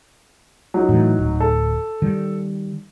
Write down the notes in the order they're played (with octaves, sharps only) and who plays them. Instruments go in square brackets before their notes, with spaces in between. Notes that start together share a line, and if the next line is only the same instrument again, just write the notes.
[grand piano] F#3 D#4
[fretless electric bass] A2 E3
D1
[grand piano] A4
[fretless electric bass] D#3 G3